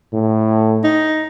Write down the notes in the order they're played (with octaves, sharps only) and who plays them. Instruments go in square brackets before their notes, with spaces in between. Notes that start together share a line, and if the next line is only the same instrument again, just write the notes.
[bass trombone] A2
[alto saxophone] D#4